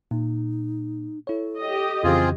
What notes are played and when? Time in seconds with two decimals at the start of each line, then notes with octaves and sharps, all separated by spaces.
0.11 A#2 D#4
1.27 E4 A4 C#5
1.59 G4 D#5
2.04 F2 C#3 E3 C4 F4 G#4